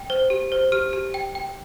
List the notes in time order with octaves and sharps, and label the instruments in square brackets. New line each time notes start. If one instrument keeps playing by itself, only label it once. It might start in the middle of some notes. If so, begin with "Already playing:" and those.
Already playing: [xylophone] G5
C5
G4
C5
G4 F6
G4
G5
G5